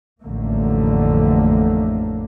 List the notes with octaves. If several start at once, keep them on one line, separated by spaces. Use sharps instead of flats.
A1 F2 D3 A3 A#3